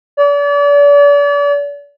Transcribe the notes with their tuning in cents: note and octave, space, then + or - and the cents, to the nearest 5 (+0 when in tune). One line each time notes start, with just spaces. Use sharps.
D5 -40